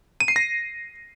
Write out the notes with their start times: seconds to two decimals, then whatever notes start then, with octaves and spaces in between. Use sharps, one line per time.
0.20 D#7
0.28 C7
0.36 A#6